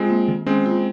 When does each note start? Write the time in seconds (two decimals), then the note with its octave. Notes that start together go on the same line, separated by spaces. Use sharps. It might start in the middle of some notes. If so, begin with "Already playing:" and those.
Already playing: G#3 C4 F4
0.10 A#3
0.28 D#3
0.46 G#3 C4 C#4
0.66 F4